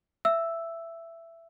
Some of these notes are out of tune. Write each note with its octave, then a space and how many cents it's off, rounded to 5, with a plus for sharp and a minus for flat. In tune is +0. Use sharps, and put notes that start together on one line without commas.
E5 +15 E6 +0